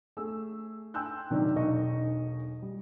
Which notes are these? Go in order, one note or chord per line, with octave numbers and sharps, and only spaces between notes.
A3 G#4 E6
G5 G#5 C6 E6 F#6 G6
A#1 C3 D#3 F#3 D5
E1 B1 D#4 D#5 C#6
G3